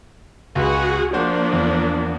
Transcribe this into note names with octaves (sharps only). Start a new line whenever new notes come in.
C#2 F#4 G#4 B4
F3 A#3 D4 F#4 C5
E2